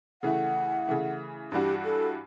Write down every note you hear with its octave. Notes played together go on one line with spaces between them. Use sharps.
C#3 E3 A3 F#5
C#3 E3 A3
G2 E3 G3 D4 F#4 G4
A4